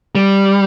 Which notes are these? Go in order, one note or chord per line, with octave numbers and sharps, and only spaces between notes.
G3